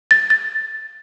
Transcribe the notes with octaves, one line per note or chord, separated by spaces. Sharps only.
A6
A6